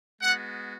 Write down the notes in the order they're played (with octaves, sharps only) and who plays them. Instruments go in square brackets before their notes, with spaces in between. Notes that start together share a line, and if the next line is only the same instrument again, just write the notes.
[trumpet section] G#3 B3 F#4 F#5